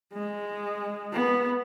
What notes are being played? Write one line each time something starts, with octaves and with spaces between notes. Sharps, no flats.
G#3
B3